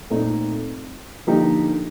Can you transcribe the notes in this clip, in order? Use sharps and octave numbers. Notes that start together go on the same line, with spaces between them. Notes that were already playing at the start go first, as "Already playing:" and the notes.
A#2 A3 C4 D#4
D3 F3 A#3 D#4 G4